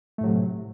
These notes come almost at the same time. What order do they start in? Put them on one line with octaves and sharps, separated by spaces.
A3 A2 F#3 C3